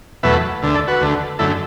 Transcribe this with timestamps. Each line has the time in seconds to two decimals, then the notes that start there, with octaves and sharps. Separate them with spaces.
0.23 E2 B2 F#3 A3 B4 E5
0.62 D2 D3 A3
0.75 A4 D5
0.88 F#4 B4
1.00 D2 D3 A3
1.39 F#2 D3 A3 E4 A4